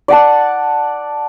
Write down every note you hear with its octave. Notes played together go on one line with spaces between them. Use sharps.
D5 F#5 A5